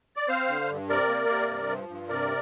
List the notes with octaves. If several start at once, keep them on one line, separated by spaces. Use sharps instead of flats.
D5
C4 C5 F5
D3
G2
C3 A#4 D5
A#3
C3
G2
F3
G2
C3 A#4 D5